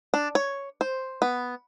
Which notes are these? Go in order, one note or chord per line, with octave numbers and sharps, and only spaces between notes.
D4
C#5
C5
B3